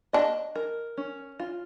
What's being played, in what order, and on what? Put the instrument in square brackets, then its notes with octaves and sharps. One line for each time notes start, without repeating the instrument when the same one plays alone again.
[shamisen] D4 [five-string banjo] D#5
[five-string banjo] A#4
C#4
F4